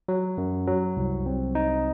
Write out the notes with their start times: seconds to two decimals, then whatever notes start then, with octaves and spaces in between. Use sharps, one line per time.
0.08 F#3
0.38 F#2
0.67 F#3
0.97 C2
1.26 C4
1.55 D#4